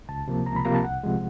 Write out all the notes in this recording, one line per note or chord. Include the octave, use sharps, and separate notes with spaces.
C#2 A5
C3 F3 A#3
C#2 A#5
B5
C3 F3 A#3 A#5
A5
C2 F#5
C3 F3 G#3